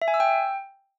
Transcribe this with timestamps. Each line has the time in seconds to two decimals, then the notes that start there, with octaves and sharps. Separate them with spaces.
0.02 E5
0.08 G#5
0.14 E6
0.20 G5